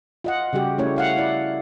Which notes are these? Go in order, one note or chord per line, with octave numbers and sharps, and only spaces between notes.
F4 D#5 F#5
C#3 G3 F#4 G4
A3 C#4 E4 C#5
E4 F5 F#5
E4 D5